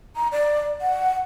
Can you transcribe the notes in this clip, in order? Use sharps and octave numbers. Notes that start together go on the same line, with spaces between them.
A#5
D5
F#5